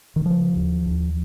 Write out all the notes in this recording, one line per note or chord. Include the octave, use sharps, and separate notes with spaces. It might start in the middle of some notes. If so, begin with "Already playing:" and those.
D#3
C#3 F3
D#2
D#2